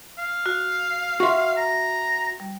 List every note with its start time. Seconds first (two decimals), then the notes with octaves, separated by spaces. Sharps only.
0.18 F5
0.46 F#4
1.20 F#4 E5 C6 C#6
1.57 A#5
2.40 G3